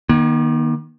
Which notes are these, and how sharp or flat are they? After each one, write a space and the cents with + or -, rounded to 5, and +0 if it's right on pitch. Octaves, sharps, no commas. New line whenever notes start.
D#3 -10 A#3 +45